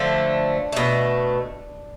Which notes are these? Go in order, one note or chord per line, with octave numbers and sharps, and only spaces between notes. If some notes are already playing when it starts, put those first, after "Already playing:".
Already playing: D3 F3 A3 D4
B2 A3